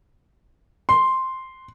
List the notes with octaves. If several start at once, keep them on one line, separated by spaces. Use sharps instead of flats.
C6